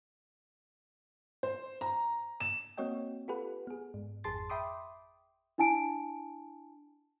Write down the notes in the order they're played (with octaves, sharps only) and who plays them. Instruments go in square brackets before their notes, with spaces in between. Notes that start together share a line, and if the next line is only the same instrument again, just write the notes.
[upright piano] C5
A#5
E7
[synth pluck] A#3 C4 F#4 C#5 D#5 G5
F4 G4 A4 B4 F#5
B3 G#4
G#2
G#1 F2 G#4 A5 C6 A6
E5 G5 B5 C6 D6 D#6
[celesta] D4 E4 G#5 A5 D7